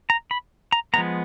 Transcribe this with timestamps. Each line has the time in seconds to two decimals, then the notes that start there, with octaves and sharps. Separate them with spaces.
0.10 A#5
0.31 B5
0.72 A#5
0.94 F3 G#3 B3 A#5